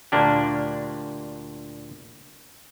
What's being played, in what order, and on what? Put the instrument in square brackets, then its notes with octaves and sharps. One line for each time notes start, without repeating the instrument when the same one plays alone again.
[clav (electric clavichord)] D2 A#2 A#3 D4 G4